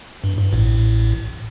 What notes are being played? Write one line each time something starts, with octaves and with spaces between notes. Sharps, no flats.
G2
G2
A1 A2